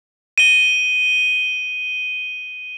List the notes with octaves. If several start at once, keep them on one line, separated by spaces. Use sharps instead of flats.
D#7 G7